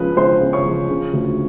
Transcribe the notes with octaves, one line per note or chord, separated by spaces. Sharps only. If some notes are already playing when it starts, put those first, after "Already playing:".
Already playing: C#2 C#3 F3 B4
C#2 C5 C6
C#3
C#5 C#6
F3
C#3
D2